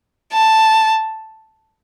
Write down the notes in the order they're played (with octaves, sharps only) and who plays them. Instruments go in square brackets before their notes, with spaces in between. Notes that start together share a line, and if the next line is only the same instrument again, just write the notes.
[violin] A5